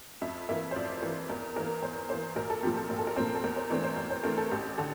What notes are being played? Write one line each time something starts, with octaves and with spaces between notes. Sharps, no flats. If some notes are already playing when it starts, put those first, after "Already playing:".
F2 E5
E3 A#3 E5
C5
F2 D5
E3 A#3
E2 A#4
E3 A#3 A#4
E2 C5
E3 A#3 C5
A#1 A#4
A4
A#2 F3 C4 G4
A4
A#1 A#4
A4
A#4
A#2 F3 C4 C5
A4
E2 A#4
C5
E3 A3 C4 D5
C5
E2 A#4
C5
E3 A3 C4 A#4
A4
A1 G4
D3 A4